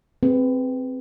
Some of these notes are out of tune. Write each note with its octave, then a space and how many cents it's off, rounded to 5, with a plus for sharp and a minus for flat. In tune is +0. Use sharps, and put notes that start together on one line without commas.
C4 -5 G#4 +0 B4 +15